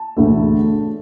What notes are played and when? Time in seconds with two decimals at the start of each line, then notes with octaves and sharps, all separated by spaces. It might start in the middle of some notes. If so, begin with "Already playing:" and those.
Already playing: A5
0.17 E1 D2 D3 A3